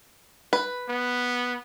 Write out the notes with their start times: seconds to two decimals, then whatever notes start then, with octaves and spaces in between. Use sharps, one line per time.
0.53 B4
0.89 B3